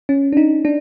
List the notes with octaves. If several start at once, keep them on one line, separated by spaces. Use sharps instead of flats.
C#4
D4
D#4
D4